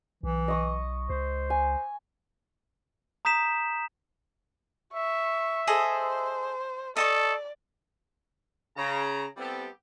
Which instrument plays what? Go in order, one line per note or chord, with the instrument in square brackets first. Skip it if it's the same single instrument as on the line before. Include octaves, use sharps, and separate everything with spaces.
[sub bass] B1 [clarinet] E3
[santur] D#5 C#6 D#6
[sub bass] C#2 [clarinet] C5
[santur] G#5
[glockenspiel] A#5 D#6 G6 B6 E7
[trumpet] E5 [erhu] C#6
[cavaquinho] G#4 A4 D#5 [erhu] C5
[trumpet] A4 [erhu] D5 [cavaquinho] D#5 A5 C#6
[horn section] C#3 A#5
G3 B3 C4 E4 G4 A4